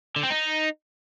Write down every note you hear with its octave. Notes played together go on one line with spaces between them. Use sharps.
D3
C4
D#4